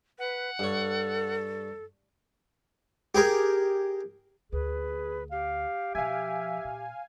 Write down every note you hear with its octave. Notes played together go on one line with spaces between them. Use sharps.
B4 F#5
G2 A4 C#5
G4 G#4 A#4
D2 G#4 B4
G4 F5
B2 F3 E5 F5 G#5
A#2